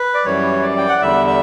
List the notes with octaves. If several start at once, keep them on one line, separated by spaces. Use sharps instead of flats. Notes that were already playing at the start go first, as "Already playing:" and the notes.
Already playing: B4
D5
F#2 E3 G3 C#5
D5
G5
F#5
E2 D3 G3 E5
E5